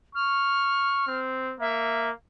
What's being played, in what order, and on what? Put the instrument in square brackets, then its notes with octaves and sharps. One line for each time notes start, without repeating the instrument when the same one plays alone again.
[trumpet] C#6 [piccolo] F6
[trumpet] C4
[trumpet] A#3 [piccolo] E5